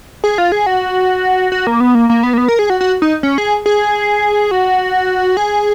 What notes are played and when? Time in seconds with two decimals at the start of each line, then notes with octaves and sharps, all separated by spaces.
0.24 G#4
0.38 F4
0.52 G#4
0.66 F#4
1.52 F#4
1.67 A#3
1.80 B3
1.95 A#3
2.10 A#3
2.23 B3
2.33 A#3
2.38 B3
2.48 A#4
2.59 G#4
2.70 F#4
2.81 F#4
3.02 D#4
3.23 C#4
3.38 G#4
3.66 G#4
4.51 F#4
5.37 G#4